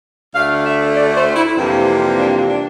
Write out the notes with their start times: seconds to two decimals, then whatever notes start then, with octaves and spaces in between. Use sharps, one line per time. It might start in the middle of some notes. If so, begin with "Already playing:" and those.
0.34 D2 D3 A3 F5
0.65 E5
0.96 D5
1.16 C5
1.36 E4
1.57 F2 C3 E3 G3 A#3 D4
2.18 D4
2.48 D4